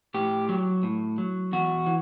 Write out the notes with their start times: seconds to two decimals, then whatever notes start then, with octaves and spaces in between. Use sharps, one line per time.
0.14 A2 G4
0.49 F#3
0.83 A2
1.18 F#3
1.52 E2 F#4
1.86 E3